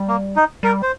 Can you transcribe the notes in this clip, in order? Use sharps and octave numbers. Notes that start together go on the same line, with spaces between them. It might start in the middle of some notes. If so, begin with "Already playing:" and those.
Already playing: G3
A#3
D#4
G3 A#4
C5